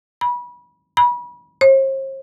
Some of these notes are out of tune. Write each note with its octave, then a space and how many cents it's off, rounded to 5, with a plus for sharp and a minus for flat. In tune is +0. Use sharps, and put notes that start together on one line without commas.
B5 -25
B5 -30
C5 +45